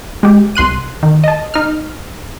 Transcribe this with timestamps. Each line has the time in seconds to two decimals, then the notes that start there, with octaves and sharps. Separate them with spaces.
0.23 G#3 G4
0.55 C2 C6 F#6 D#7
1.03 D#3
1.24 D#5 A5
1.54 D#4 F6